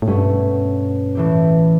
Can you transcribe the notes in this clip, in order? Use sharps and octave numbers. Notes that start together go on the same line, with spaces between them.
A2
G2 B2 A3 C#4
A2 E3 A3 E4 G4